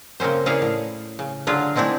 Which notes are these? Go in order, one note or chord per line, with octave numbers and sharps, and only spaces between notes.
C#3 A#3 C4 C#4 C5
A#3 C#4 E4 G#4 D5 F5
A2
C#3
D3 F#3 F4 G#4
G#3 A3 C4 D4 E4